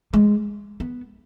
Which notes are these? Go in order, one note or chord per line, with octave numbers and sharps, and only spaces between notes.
G#3
B3